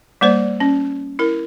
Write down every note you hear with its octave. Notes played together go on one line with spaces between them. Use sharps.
G3 A#3 C5 D5
C#4
E4 A#4